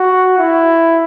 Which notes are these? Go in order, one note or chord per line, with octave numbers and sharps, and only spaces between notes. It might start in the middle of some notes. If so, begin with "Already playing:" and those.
Already playing: F#4
E4